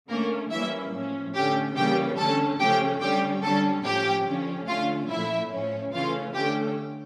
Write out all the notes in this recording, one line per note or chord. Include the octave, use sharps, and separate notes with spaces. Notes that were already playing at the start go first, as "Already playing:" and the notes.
D3 A3 A#3 C#4 A#4
E3 G3 A#3 C#4 E4 E5
A2 F3 C#4
D3 A3 C#4 G4 G5
C#3 E3 G3 A#3 C#4 G4 G5
D3 A3 C#4 A4 A5
C#3 F3 A3 C#4 G4 G5
D3 G3 C#4 G4 G5
D3 G3 C#4 A4 A5
A2 F3 C#4 G4 G5
D3 F3 C#4
D3 A3 C#4 F4 F5
A#2 F3 A3 E4 E5
A2 F3 C#4
C#3 E3 A3 C#4 F4 F5
D3 A3 C#4 G4 G5